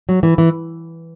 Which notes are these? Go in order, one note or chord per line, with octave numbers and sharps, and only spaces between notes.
F#3
E3
E3